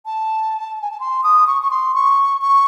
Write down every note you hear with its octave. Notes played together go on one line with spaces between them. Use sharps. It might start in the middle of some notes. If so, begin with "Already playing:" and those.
A5
G#5
A5
C6
D#6
C#6
C#6
C6
C#6
C#6